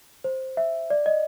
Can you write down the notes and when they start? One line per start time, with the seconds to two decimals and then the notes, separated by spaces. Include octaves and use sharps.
0.24 C5
0.57 E5
0.90 D5
1.06 D#5